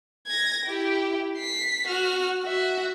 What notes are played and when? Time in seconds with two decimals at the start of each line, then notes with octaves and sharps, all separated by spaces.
0.27 G#6 A#6
0.66 E4 G4
1.38 B6 C7
1.87 F#4 F6
2.45 F#4 E5